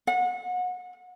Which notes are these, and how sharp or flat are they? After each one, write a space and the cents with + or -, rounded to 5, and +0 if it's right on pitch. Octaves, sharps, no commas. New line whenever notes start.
F#5 -30